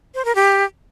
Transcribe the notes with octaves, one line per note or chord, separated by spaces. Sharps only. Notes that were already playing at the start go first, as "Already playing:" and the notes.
C5
A#4
G4